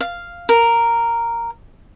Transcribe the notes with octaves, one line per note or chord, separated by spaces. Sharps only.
F5
A#4